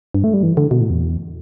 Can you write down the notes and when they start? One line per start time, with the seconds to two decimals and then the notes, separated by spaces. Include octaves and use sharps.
0.14 G2
0.24 A3
0.34 G3
0.43 E3
0.57 D3
0.71 B2
0.81 A2
0.90 E2